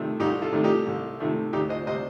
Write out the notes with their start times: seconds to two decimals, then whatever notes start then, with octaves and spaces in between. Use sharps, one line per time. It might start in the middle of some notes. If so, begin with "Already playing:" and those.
Already playing: C3 D#3 A3
0.20 C2 D#4 G4
0.42 F4 A4
0.52 C3 D#3 A3
0.64 D#4 G4
0.87 C2
1.20 C3 D#3 A3
1.53 D2 D#4 G4
1.69 C5 D#5
1.87 C3 G3 C5 D#5